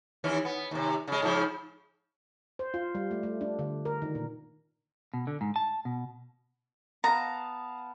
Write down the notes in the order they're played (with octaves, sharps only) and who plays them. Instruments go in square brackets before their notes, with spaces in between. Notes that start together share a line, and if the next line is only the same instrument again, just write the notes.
[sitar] D#2 E3 C#4
B3
D#2 C3
C#3 G#3
G#2 C#3 F3
[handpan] C5
F4
G3
A3
A3
D4
D3
A#4
D#3
A#2
[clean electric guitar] B2
D3
G#2
A5
B2
[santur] B3 F5 A5 [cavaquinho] A#5